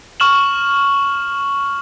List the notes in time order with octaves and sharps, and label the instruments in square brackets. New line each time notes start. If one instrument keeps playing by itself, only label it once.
[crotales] C#6 F6 E7 F#7